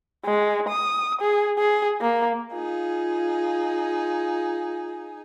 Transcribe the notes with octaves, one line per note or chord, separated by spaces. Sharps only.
G#3
D#6
G#4
G#4
A#3
D#4 F4 G#4